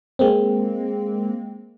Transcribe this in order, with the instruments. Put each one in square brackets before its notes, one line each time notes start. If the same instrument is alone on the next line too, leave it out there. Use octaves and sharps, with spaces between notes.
[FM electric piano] G#3 A#3 C4